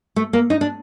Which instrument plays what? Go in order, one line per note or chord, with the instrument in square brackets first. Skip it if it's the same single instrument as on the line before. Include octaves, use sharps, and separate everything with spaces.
[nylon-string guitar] A3
A#3
D#4
D4